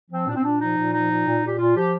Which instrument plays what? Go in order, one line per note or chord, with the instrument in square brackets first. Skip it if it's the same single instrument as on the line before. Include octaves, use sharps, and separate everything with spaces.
[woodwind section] F3 C4
A#2 D4
C4
A#2 D4
F3 D#4
A#2
F3 D#4
A#2
A#2
A#2 G4
A#2 F4
F3 G4